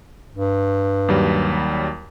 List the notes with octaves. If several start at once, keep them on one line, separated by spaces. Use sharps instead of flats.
G2
D#2 F#3 G3